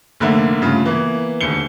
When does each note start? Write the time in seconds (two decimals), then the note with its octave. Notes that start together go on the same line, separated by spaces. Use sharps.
0.20 F1 D3 A3 A#3 E5 F#5
0.61 G2 C#3 A3 F4
0.85 E3 A#3 B3
1.41 D#1 D2 C#7 G7